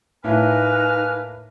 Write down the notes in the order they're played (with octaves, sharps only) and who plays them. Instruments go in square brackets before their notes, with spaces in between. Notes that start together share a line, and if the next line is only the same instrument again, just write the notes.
[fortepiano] A2 [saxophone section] A#3 B4 [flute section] D#4 G#5 F#6 [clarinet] F6